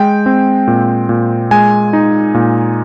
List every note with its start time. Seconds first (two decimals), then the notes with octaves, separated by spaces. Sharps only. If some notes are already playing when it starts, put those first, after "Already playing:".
Already playing: G#3 G5
0.26 C4
0.67 A#2
1.09 A#2
1.51 G#3 G#5
1.93 D#4
2.34 A#2